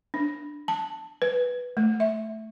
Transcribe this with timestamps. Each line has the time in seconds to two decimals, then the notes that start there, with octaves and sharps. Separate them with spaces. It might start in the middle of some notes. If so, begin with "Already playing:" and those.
0.14 D4
0.68 A5
1.22 B4
1.77 A3
2.00 E5